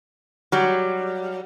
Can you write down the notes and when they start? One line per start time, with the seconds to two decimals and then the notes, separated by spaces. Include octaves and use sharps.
0.52 F#3 G3